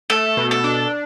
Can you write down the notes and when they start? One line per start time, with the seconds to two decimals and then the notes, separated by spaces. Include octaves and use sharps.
0.10 A3 A4
0.37 B2
0.51 A4
0.64 D4